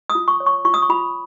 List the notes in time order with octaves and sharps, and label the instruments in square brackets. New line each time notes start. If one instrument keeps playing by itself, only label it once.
[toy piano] D#6
F4
C#6
C#5
C#6
F4 C#6
D#6
C#6
F4 B5